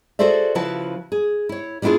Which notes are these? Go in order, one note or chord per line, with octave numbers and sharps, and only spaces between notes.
F#4 G#4 A4 C5 D5 E5
C#3 F3 E4 F#4 B4 A5
G#4
E4 C#5
G3 B3 D4 E4 F4 G#4